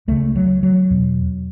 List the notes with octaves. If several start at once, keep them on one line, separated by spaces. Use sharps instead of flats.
C#2 C#3 A3
F#3
F#3
E2 B2